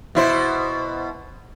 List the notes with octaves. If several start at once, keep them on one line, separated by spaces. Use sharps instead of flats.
B2 E4 C5